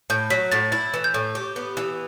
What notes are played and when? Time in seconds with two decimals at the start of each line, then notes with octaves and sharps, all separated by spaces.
0.10 A2 G6
0.30 F#3 B6
0.52 A2 A6
0.72 E4 A6
0.94 E3
1.04 G6
1.14 A2
1.35 G4
1.56 B3
1.77 E3